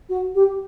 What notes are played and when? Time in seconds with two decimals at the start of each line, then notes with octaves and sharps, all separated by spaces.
0.09 F#4
0.35 G4